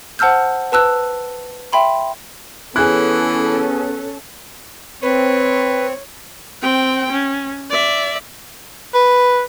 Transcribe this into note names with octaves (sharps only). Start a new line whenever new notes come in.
C5 F#5 A5 E6 F6 G6
B4 A5 E6 F#6
E5 G5 B5 C6
E3 B3 C#4 G#4 A4 F#6
C4 B4 C#5
C4 G5
C#4
D5 E5
B4